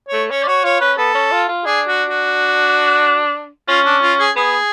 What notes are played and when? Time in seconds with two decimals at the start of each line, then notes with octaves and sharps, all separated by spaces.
0.08 A3 C#5
0.30 C#4 C#5
0.43 D5
0.47 F#4 C#5
0.64 F4 C#5
0.81 C#4 B4
0.98 B3 A4
1.15 C#4
1.32 F4
1.49 F4
1.65 D4 G#4
1.88 F#4
2.10 F#4
3.68 C#4 F4
3.85 D4
4.02 F4
4.19 G#4
4.36 B3 G#4